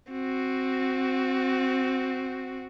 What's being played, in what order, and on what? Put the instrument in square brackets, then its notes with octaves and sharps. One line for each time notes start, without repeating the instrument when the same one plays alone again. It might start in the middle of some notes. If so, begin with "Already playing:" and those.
[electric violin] C4 F#4